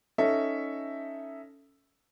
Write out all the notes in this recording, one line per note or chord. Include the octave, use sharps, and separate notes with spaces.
C#4 D#4 A4 E5